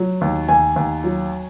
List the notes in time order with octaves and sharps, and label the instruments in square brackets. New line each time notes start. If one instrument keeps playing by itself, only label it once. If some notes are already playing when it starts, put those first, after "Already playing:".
Already playing: [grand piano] F#3
D#2
D#2 G#5
D#2
F#3